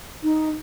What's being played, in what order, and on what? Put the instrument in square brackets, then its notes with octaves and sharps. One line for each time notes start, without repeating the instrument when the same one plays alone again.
[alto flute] D#4